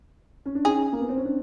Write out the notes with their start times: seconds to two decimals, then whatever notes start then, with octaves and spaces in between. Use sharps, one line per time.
0.46 C#4
0.55 D4
0.65 C#4 D#4 G#4
0.93 A#3
1.00 B3
1.09 C4
1.17 C#4
1.25 C4 D4